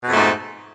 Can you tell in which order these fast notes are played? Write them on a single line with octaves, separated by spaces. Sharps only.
B2 F2 A3 G#2